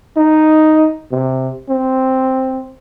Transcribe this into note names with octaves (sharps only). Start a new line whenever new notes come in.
D#4
C3
C4